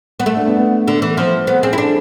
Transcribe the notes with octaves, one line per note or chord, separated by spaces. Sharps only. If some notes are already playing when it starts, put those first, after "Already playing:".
B3
A3
D4
B3
B3
D3
E3
F3 C4
B3 C4
C4 G#4
E4
D4 A4